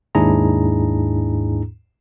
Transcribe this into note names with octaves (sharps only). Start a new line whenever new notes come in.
D#2 G#2 D4 E4 G#4 A#5